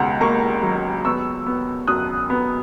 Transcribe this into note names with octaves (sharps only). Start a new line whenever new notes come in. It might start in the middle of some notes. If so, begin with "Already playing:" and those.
Already playing: C#2 B2 F#5 A#5
A#3 A#5 C#6
F#3
B3 C#6 E6
B3
F#2 D#6 F#6
B3